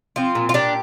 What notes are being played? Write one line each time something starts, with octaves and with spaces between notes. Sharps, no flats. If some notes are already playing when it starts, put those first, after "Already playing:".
F3 C4 F4
A#2
F4
A#2 D4 G4